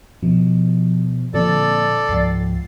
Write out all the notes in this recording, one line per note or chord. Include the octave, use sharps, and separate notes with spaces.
B2 F3
A#2 D3 F3 C4 A4 D5
C#2 G#2 F3 A6 C7